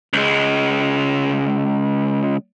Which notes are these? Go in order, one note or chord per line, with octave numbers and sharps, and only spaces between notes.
C#2 G#3